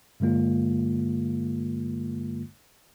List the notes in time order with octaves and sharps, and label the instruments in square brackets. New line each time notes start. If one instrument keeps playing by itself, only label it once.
[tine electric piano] G2 D3 G#3 A#3 F4